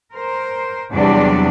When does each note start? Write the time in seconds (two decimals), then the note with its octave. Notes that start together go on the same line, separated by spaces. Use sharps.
0.12 A#4 C5
0.93 E2 C3 F#3 G3 D4 D5